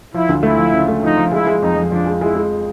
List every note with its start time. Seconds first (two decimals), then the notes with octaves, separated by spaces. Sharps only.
0.14 F3 E4
0.29 D2
0.43 A3 E4
0.58 F3
0.73 C#3
0.88 A3
1.03 F3 D#4
1.17 F3
1.32 G#3 E4
1.47 G#3
1.61 F2 D#4
1.76 F2
1.91 F3 D4
2.06 G#3
2.21 G#3 E4
2.35 G#3